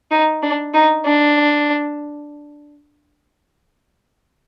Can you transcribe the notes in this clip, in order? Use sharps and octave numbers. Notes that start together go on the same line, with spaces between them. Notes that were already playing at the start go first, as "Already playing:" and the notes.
D#4
D4
D#4
D4